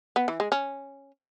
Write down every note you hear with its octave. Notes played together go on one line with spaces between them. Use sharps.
B3
E3
G#3
C#4